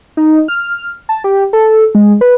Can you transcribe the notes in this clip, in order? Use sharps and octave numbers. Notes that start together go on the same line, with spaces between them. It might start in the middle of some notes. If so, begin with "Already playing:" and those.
D#4
F6
A5
G4
A4
G#3
B4